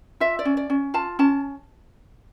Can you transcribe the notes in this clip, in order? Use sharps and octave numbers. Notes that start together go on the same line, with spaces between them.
F4 E5
D5
C#4
D5
C#4
F4 A5
C#4 A5